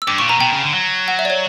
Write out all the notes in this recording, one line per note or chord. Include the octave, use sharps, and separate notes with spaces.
E6
G2 D6
A#2 C#6
B2 A#5
B2 G5
C#3
D3
F#3
F#5
E5
D5
C#5